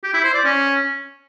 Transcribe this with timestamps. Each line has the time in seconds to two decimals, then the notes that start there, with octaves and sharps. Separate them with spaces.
0.04 G4
0.14 E4
0.24 C5
0.34 D5
0.44 C#4